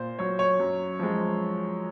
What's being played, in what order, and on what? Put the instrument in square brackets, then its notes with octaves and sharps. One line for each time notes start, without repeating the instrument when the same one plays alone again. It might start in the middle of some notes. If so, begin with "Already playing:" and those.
Already playing: [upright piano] A#2 C5
F#3 C#5
C#5
F#2
F3 G#3